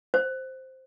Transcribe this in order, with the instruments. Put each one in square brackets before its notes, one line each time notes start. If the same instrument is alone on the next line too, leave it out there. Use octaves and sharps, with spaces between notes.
[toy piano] C5